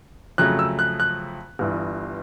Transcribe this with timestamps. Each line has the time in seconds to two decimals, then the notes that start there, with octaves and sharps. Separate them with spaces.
0.38 F2 C#3 F#3 A3 F#6
0.59 E6
0.79 F#6
1.00 F#6
1.59 G1 G2 E3